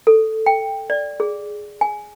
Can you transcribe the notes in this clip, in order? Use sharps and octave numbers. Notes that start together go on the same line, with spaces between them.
A4
G5
D5
G#4
G#5